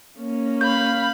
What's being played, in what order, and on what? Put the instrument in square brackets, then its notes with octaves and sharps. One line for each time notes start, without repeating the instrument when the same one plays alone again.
[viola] A#3 C#4
[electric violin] F5 B5 [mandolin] G6